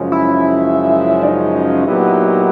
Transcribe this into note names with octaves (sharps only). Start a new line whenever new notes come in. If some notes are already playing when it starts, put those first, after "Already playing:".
Already playing: F#2 C#3 F3 G#3 C#4
E4
D4
D#4
A#2 F#3 B3 E4 G4